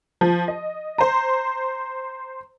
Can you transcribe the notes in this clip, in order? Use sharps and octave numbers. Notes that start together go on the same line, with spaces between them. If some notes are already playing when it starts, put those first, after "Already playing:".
F3
D#5
C5 A#5